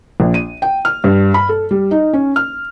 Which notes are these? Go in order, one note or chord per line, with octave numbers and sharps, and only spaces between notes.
A#1
D#7
G5
F6
G2
B5
A4
G3
D#4
C#4
F6